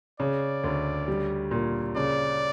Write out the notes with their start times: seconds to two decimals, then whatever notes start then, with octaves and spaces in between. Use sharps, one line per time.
0.20 C#3 D5
0.64 D2
1.08 G3
1.51 A#2
1.96 C#3 D5